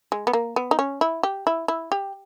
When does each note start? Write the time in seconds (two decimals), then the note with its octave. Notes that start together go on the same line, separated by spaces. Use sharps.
0.12 G#3
0.27 B3
0.33 A#3
0.56 B3
0.71 D#4
0.79 C#4
1.01 E4
1.23 G4
1.47 E4
1.68 E4
1.92 G4